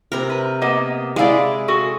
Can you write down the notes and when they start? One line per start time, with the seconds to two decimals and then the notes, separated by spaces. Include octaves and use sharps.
0.12 C3 A#4
0.30 B4
0.61 A#3 B3 D#5
1.16 G#3 E4 D5 F5 G#5
1.68 F#4 G#4 A4